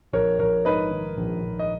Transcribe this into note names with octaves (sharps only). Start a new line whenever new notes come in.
A#1 A#4 C#5
A#1 A#4 C#5
G#2 B4 D#5
D#3
A#1
A#1
D#5